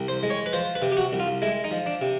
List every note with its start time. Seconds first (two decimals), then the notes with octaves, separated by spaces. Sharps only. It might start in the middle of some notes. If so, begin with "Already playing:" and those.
Already playing: C2
0.08 C5
0.23 G#3
0.30 C#5
0.46 B4
0.53 F3 C5
0.75 B4
0.82 C3
0.92 G4
0.97 F#4
1.13 C2
1.19 F4
1.42 G#3 E4
1.64 D#4
1.71 F3
1.86 D4
2.01 C3